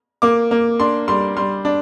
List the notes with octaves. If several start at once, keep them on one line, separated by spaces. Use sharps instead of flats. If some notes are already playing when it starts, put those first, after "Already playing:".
A#3 D6
A#3
D4 C6
G3 C6
G3 C6
D4